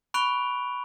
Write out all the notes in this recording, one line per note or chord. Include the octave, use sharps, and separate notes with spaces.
B5 C#6 F#6 D7 F7 G7